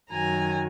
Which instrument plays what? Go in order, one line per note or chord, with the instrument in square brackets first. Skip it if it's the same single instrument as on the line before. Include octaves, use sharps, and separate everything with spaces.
[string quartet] F#2 D#3 F#3 G#5 A#5